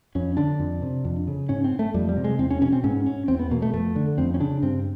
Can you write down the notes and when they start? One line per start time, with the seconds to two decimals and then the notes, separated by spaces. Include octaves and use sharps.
0.15 F2 C#4
0.37 D3 D4
0.59 F2
0.82 C3
1.05 F2
1.27 C#3
1.49 G#2 C#4
1.64 C4
1.79 A3
1.94 F2 G3
2.09 G3
2.17 C3
2.24 G#3
2.39 E2 C4
2.51 C#4
2.62 B2 C#4
2.72 C4
2.84 G#2 C#4
3.06 C#4
3.28 E2 C4
3.39 B3
3.51 B2 A#3
3.62 A3
3.74 F2 A3
3.96 D3
4.18 F2 C4
4.34 C#4
4.40 C#3 D4
4.63 G2 C4